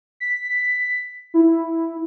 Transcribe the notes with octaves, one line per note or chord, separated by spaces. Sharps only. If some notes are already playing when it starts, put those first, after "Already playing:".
B6
E4